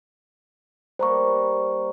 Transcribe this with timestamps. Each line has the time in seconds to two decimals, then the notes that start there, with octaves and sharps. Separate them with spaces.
0.99 G3 A#3 C5 A#5 C#6